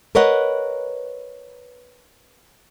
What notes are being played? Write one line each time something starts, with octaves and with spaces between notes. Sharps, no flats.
A#4 B4 C#5 D#5 F#5